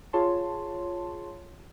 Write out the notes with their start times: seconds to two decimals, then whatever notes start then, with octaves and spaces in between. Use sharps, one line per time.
0.13 F4 G#4 C#5 A5 C6